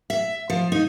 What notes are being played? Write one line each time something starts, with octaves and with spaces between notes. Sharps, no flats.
E5
F3
D#4